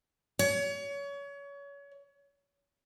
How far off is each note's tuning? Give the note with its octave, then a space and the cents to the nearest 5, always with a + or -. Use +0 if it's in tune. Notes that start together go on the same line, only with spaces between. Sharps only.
C#5 +30